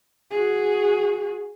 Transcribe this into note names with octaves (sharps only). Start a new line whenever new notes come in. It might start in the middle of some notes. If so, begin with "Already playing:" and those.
F#4 G#4